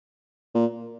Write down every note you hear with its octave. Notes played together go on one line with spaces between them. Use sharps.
A#2